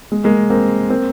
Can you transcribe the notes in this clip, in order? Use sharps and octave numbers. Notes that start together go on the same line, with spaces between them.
G#3
G#3 A#3
A#3 C4
A#3 C4